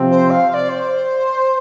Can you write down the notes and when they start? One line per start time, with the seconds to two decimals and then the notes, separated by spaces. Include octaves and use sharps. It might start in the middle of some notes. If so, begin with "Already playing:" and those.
Already playing: C3 F3 C4
0.11 C5
0.30 F5
0.50 F5
0.54 D5
0.69 C5